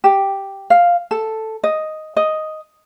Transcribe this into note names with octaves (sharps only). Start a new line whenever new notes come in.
G4
F5
A4
D#5
D#5